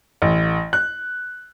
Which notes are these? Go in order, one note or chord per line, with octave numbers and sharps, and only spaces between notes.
A1
F#6